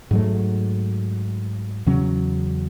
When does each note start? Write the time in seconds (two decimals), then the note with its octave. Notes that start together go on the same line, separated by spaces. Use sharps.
0.11 G#2 F#3 A3
1.86 E2 C#3 F#3 C#4